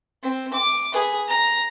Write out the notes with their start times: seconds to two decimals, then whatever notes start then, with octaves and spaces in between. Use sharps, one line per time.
0.23 C4
0.54 D6
0.93 G#4 B4
1.28 A#5